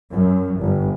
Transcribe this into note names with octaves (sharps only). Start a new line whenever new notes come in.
F#2
G1